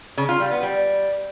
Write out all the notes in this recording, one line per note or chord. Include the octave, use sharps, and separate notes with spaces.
C#3
F4
G3
B3
G3